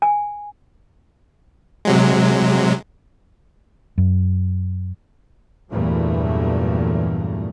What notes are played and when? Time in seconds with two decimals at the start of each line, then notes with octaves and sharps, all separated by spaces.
0.02 G#5
1.85 C3 F#3 G#3
3.98 F#2
5.71 E2 G2 A#2 E3 F#3 A3